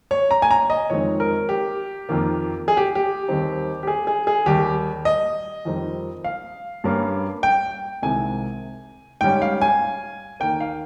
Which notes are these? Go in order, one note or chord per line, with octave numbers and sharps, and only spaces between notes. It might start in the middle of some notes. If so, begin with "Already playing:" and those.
C#5
A#5
G#5
A#5
D#5
F2 D#3 G#3 C4 D#4 C#5
A#4
G4
F2 D#3 A#3
G#4
G4
G4
D#2 D#3 G3 C4 D#4
G4
G#4
G#4
G#4
D#2 D#3 G3 G4
D#5
F2 D#3 G3 C4 D#4
F5
G2 G3 A#3 C#4
G5
C2 C3 D#3 G#3 G#5
G#2 G3 C#4 G5
F5
G#5
D#2 D#3 A#3 G5
F5